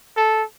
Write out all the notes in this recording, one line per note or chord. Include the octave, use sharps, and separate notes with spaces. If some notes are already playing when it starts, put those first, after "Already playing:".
A4